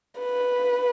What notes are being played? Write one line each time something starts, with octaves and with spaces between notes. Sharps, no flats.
B4